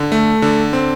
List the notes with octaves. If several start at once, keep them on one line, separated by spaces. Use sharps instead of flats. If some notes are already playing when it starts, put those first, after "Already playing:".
Already playing: D3
A3
D3
C4